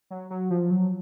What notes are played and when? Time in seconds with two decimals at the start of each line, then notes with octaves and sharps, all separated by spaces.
0.10 F#3
0.30 F#3
0.50 F3
0.71 F#3